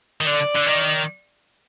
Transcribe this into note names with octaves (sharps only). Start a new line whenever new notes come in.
D#3
D3 D5
D3
D#3